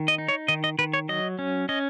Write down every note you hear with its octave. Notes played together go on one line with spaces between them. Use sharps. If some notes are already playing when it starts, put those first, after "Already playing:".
Already playing: D#3
D#5
D#4
C#5
D#3 D#5
D#5
D#3 B4
C#5
F#3 D#5
C#4
C#4 D#5